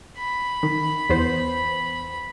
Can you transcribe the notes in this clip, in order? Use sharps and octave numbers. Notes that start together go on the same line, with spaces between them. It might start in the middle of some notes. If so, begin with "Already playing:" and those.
B5
D#3
E2 B3 C5